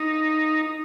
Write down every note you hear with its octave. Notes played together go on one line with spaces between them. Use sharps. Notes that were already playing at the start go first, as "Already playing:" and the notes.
Already playing: D#4